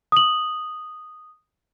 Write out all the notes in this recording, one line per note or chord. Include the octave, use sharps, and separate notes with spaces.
D#6 F#7